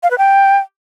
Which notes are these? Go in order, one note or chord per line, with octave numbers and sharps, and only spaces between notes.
F5
B4
G5